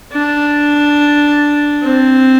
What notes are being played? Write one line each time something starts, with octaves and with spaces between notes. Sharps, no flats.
D4
C4